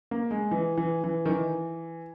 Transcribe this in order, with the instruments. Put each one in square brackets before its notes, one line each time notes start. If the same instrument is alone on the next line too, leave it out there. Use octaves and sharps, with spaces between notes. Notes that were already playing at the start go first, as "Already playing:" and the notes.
[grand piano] A#3
G#3
E3
E3
E3
D#3
E3